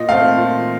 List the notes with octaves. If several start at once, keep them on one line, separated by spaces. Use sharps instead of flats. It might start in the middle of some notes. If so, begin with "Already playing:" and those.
Already playing: A#2 D#5
A3 C4 F5
A#2